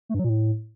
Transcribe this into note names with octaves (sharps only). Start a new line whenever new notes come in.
A3
G2
F#3
A#2
A2